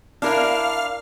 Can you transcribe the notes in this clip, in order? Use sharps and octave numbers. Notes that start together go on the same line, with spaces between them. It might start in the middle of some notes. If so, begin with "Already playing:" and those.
D4 E4 A#4 F5 F6